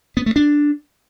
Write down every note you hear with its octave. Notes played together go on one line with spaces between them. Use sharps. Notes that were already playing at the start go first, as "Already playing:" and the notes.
B3
A3
D4